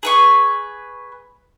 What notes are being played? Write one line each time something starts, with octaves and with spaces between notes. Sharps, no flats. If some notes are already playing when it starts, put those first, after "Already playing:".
G#4 B4 C#6